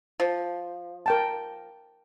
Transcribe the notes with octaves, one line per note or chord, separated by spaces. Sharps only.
F3
A#4 G5 A5